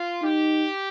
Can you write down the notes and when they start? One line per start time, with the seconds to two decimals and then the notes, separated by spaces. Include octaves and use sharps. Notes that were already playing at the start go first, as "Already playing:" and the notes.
Already playing: F4
0.23 D#4 G4